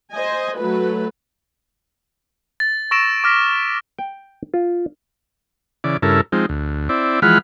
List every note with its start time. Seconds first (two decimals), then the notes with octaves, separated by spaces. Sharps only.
0.13 C5 D#5 G#5
0.58 F#3 A3 B4
2.60 A6
2.91 C#6 E6 A#6 D7 E7
3.24 D6 F6 A#6 B6
3.99 G5
4.54 F4
5.84 C#3 E3 D5
6.02 G2 C#3 E4 A4 A#4
6.32 F3 G#3 C4 D#4
6.49 D2
6.89 C4 E4 D5
7.22 E3 F3 G#3 F#5 B5 F6